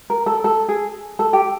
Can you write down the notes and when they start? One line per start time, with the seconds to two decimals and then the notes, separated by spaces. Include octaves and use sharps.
0.10 A#4
0.26 A4
0.44 A4
0.69 G#4
1.19 A4
1.33 G4